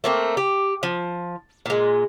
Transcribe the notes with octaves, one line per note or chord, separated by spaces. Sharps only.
A3 A#3 C4
G4
F3
A#2 G#3